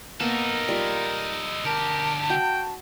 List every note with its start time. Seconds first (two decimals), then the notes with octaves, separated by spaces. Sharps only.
0.20 A#3 B3 D#4 A4 A#4
0.68 G3 F4
1.65 D2 G4 A#4 A5
2.30 F#4 G5